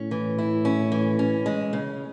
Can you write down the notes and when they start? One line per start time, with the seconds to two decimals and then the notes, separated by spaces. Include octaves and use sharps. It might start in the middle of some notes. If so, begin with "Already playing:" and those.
Already playing: A2 C#4
0.11 E3
0.38 E4
0.65 C#4
0.92 E3
1.19 C#4
1.46 G#3
1.73 C#3